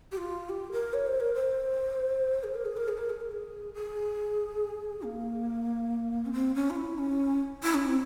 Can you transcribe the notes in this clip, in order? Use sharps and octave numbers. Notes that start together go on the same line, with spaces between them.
G4
F4
G4
A#4
C#5
C5
A#4
C5
G#4
A#4
G#4
A#4
G#4
A#4
G#4
A#4
G#4
G#4
A#3
C#4
C4
C#4
F4
E4
C#4
E4
C#4
C4